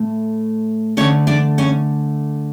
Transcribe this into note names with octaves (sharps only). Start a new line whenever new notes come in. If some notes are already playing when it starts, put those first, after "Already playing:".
Already playing: A2 A3
D3 A3 C#4 C#5
D4 D5
C#4 C#5